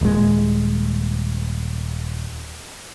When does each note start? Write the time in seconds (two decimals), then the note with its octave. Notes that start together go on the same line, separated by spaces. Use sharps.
0.01 D#1 G#3